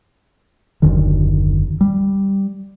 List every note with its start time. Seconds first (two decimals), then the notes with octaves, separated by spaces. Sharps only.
0.82 F#1 D#2 D3 D#3
1.81 G3